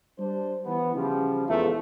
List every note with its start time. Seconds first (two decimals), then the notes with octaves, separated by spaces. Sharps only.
0.19 G3 D4 C5
0.66 E3 B3
0.95 C#3 F3 G3
1.48 A#1 E2 G#2 A3 F4